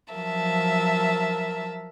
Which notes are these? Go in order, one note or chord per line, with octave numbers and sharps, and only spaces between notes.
F3 F#3 A#4 E5 A5